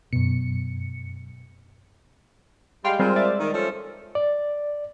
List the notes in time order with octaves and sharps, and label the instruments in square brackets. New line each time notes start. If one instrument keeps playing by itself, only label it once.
[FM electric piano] F#2 C#7 [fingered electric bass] B2
[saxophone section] G3 G#3 G4 [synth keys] F5 G5 C6
[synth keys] G3 G#3 C4 [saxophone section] F4 A#4 C5
[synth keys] D5 E5 A6
[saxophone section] D#3
F3 C#4 A4
[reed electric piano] D5